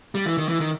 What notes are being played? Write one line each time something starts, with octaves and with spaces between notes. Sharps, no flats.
G3
E3
D#3
E3
D#3